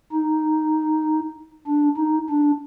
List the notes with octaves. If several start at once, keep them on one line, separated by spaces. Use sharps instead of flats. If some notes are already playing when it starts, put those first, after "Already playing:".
D#4
D4
D#4
D4